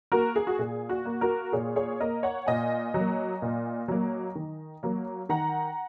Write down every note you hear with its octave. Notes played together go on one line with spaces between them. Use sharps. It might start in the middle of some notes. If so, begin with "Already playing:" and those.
A#3 F#4 A#4
G#4
F#4
A#2 G#4
F#4
A#3
F#4 A#4
A#2 G#4 C#5
G#4 C#5
A#3 A#4 D#5
C#5 F#5
A#2 D#5 G#5
F#3 A#3
A#2
F#3 A#3
D#3
F#3 A#3
D#3 F#5 A#5